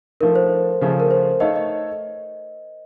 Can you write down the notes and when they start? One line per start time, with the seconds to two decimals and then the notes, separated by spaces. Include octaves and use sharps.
0.20 F3 A3 D#4 A#4
0.35 C5
0.81 C#3 F3 A3
1.00 A#4
1.11 C5
1.40 A3 D#4 A4 C#5 D#5 F5
1.56 D#5